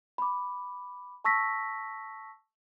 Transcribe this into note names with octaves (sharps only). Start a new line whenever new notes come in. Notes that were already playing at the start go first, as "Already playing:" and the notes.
B5 D6
A5 C#6 E6 A#6 B6